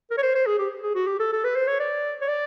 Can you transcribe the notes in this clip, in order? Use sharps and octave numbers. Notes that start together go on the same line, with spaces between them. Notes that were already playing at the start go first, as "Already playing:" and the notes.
A#4
C#5
C5
C5
G#4
G4
G#4
F#4
G4
A4
A4
B4
C5
C#5
D5
C#5
D5